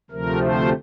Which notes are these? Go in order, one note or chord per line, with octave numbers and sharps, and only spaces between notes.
D2 C3 F3 A3 A#4
C5